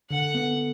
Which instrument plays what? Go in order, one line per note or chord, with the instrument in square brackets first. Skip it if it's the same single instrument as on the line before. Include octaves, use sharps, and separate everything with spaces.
[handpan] D3 [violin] F#5
[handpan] B3